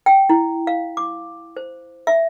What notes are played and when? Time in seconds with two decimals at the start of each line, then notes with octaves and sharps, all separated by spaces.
0.06 G5
0.29 E4
0.67 F5
0.97 D6
1.57 C5
2.07 E5